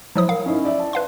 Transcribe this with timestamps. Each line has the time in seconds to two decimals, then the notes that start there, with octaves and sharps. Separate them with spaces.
0.15 F3 F#3 E4 C5 D#6
0.29 A#4 F5
0.46 C#4 D#4 E4
0.65 D5 E5
0.79 A5
0.93 B4 F5 C6